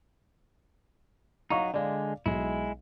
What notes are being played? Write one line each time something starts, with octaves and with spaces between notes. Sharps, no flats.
F#3 D#4 F5 A#5 C#6
D3 G#3 D5 F5
B1 G#3 E4